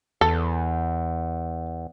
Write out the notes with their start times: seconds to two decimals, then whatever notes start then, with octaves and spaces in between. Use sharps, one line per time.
0.21 E2 A4